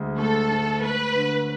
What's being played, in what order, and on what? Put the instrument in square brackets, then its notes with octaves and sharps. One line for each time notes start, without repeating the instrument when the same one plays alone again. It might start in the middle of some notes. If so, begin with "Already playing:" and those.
Already playing: [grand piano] D2 G#3
[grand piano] A3 [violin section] A4
[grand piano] G#2
[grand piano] A3 [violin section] B4
[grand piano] D3